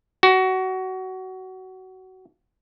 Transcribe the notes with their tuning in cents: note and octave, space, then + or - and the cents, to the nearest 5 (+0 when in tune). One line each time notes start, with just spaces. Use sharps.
F#4 +20